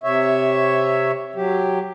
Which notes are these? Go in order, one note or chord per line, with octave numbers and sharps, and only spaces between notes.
C3 C#5 E5
F#3 G4